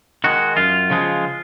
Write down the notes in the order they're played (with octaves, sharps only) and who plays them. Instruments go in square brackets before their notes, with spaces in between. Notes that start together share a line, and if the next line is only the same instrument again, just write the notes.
[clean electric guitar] D#3 G#3 F#4
F#2 F4
C#3 F3 G#3